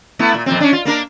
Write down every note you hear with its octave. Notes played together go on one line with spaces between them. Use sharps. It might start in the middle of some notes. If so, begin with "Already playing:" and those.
A3 B3 E4
A#2
F2 A#2 C4
C#4 D4
F4
A#3 D4 A#4